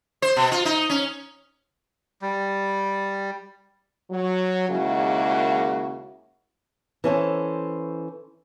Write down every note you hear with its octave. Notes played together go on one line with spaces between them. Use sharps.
C5
B2
F4
D#4
C#4
G3
F#3
D#2 C#3 G#3 A#3 E4 F#4
E3 C#4 A4 C5